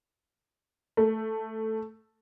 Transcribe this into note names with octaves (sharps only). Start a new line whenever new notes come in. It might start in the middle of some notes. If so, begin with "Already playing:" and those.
A3